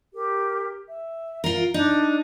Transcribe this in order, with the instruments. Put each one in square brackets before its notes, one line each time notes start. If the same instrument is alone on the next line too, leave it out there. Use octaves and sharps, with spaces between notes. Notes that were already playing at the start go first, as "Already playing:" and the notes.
[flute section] G4 A#4
E5
[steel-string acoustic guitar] F4 A#4
[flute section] D4 [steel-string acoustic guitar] D#4